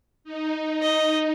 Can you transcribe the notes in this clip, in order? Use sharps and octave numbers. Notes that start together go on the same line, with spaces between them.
D#4
D#5